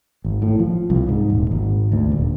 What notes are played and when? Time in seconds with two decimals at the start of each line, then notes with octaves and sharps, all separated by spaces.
0.25 G#1
0.42 A2
0.59 F3
0.90 C2
1.09 G#2
1.30 D#1
1.51 G#1
1.92 D2
2.12 D#1